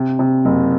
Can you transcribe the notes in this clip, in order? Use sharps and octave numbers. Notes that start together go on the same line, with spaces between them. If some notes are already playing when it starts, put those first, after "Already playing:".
Already playing: C3
C3
F#1